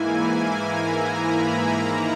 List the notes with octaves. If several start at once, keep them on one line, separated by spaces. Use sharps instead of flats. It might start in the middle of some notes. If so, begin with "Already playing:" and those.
Already playing: G#2 E3 A#3 E4 G#5
A#5
B5
G#2 D#3 A#3 E4 A#5